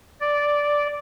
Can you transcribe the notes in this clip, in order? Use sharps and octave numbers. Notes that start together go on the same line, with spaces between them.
D5